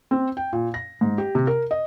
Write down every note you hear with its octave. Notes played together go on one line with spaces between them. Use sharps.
C4
G5
A#2
A#6
G#2
G4
C3
A#4
D#5